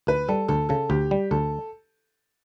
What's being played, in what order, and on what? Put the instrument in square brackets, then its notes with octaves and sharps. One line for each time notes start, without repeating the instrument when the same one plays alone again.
[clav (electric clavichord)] D2 [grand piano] B4
[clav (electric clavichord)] G3 [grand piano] A4
[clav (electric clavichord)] D2 [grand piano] A4
[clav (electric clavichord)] C#3 [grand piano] A4
[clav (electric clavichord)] D2 [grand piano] G4
[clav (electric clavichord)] G3
[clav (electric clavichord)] D2 [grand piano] A4